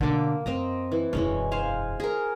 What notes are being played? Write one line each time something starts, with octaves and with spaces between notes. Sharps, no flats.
B2 D3 A#3 D6
F#2 C4 D#5 A#5
E3
E1 F#2 E3 G#3 C#4
C5 F5 G#5
G#4 A#4